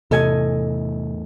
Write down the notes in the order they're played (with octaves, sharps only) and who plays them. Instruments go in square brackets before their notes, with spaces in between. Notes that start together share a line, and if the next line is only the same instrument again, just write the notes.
[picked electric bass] E2 A2 [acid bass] C3 [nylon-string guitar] A4 D#5 G#5